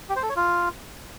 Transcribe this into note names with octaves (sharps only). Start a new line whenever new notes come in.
G4
C5
A4
C#5
F4